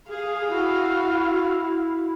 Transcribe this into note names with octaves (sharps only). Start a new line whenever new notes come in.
G#4 F5
E4 F#4